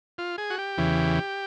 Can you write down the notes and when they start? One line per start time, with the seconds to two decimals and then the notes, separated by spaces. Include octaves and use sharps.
0.18 F4
0.38 G#4
0.50 F#4
0.58 G4
0.78 E2 C#3 E3